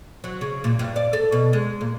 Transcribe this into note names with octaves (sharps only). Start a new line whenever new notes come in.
F#3
C#3
A#2
G2
D5
A4
B2
G#3
A#2